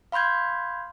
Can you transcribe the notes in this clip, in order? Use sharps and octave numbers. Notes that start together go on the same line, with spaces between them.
F5 B5 C6 G6 G#6